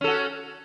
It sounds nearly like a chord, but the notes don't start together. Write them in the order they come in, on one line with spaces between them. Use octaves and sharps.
C#4 A4 F#4